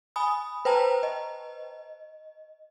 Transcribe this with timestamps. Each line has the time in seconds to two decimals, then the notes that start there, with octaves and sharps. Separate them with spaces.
0.16 G#5 B5 D#6
0.65 B4 C5 G5 A5 A#5
1.03 D#5